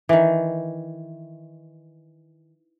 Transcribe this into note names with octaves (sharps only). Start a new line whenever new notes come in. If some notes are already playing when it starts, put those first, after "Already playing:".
D#3 E3